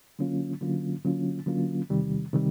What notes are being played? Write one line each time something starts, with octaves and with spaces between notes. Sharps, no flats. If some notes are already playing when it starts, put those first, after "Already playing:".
D3 F#3 A#3 C#4 F4
D3 F#3 A#3 C#4 F4
D3 F#3 A#3 C#4 F4
D3 F#3 A#3 C#4 F4
E2 C3 D#3 G3
C3 D#3 G3